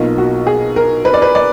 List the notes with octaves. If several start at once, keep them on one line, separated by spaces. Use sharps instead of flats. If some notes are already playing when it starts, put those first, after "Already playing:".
Already playing: B1 B2 A#3 F4
F#4
G#4
A#4
B4
D5
B4
D5